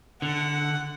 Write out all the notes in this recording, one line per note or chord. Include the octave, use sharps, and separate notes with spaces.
D3 F#5